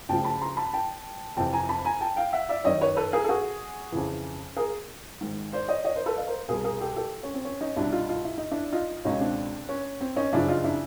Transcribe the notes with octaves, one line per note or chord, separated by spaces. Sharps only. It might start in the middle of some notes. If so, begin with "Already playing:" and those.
D2 C#3 F3 G5 A5
A5 B5
A#5 C6
A5 B5
G5 A5
F2 C3 E3 G5 A5
G#5 A#5
A5 B5
G#5 A#5
G5 A5
F5 G5
E5 F#5
D5 E5
F#2 D#3 C#5 D#5
B4 C#5
A4 B4
G#4 A#4
A4
F#4 G#4
F2 C#3 E3
G#4 A#4
G#2 D#3
C5 D5
C#5 D#5
C#5 D#5
A#4 C5
A4 B4
D#5 F5
A#4 C5
C2 B2 G#4 A#4
G#4 A#4
G4 A4
G4 A4
C#4
C4
C#4
C#4 D#4
C2 B2 D4 E4
D#4 F4
D#4 F4
E4
D#4
D4 E4
D#4 F4
C#2 B2 C#4 D#4
C4 D4
C#4
C4
C#4 D#4
F#2 C#3 F3 D4 E4
D#4 F4
D4 E4